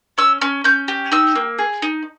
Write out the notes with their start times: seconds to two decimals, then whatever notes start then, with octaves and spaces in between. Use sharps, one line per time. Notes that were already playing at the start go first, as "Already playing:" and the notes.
0.18 C#4 E6
0.41 C#4
0.64 C#4 G6
0.88 G4
1.12 D#4 E6
1.35 A#3
1.59 G#4
1.82 D#4